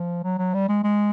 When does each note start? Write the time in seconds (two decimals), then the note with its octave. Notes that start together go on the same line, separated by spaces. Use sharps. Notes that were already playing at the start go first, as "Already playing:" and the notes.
Already playing: F3
0.24 F#3
0.38 F#3
0.54 G3
0.69 G#3
0.84 G#3